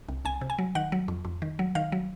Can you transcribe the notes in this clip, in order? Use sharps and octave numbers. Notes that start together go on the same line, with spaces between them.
C2
C2 G#5
C3
G#5
F#3
D#3 F#5
F#3
F2
F2
D#3
F#3
D#3 F5
F#3